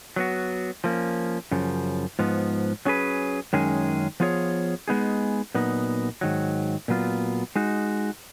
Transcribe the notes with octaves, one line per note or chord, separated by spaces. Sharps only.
F#3 B3 F#4
F3 A#3 C#4
F#2 C#3 F3
G#2 F3 B3
F#3 C#4 G#4 B4
F#2 D#3 G#3 C#4 G#4
F3 B3 F4 G#4 C#5
G#3 B3 D#4 G#4
A#2 F#3 B3 D#4
G#2 D#3 F#3
A#2 F#3 B3 F4
G#3 D#4 F#4